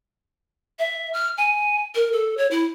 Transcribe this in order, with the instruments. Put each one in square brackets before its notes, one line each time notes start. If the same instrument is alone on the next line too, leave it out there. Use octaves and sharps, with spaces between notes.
[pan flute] E5
F6
G#5
A#4
A4
C#5
E4